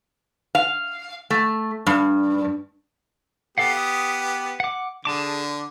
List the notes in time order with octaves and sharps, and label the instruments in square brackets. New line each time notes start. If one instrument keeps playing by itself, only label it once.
[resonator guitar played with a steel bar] F5
A3
G2
[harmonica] B3 G4 [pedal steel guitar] A4 F5 F#5
[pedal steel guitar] D#6
F#5 D6
[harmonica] D3 [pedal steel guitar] G#4 A5 D6